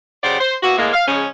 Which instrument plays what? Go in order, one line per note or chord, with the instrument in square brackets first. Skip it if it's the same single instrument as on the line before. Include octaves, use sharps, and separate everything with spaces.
[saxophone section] C#3 F#3 G4 C5 D5 F#5
C5
A#3 B3 E4 F#4
A2 G#3 A#3
F5
C#3 F3 G#3 C#4